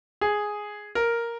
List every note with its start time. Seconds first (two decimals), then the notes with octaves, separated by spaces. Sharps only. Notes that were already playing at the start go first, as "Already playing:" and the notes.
0.21 G#4
0.95 A#4